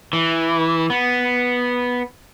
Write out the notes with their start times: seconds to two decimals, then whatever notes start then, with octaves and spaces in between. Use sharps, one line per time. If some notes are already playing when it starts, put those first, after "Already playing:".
0.13 E3
0.90 B3